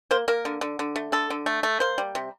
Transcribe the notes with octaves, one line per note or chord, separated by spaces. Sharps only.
A#3 C5
A#3 A#4
D3
D3
D3
A3
D3 A4
D3
A3
A3
A#3 C5
G3
C3